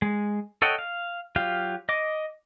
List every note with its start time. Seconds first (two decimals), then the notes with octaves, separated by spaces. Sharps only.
0.02 G#3
0.62 A4 C#5 D#5 F#5 G5
0.79 F5
1.36 F#3 F4 G4 F5
1.89 D#5 D6